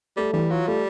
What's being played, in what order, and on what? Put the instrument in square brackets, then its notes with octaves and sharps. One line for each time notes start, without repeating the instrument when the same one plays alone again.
[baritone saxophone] G3 [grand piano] A3
[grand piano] E3 [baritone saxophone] G3
[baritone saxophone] F#3 [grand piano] F4
[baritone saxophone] G3 [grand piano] A3